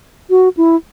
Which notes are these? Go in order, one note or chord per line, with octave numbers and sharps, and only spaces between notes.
F#4
E4